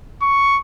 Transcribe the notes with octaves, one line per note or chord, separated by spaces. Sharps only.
C#6